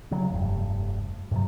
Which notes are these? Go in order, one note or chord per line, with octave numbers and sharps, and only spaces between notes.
C#3 F#3
F1 G2
G2 C3 F#3